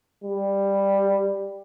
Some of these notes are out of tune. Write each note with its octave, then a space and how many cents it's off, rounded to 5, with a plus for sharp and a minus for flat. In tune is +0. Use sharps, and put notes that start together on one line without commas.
G3 +10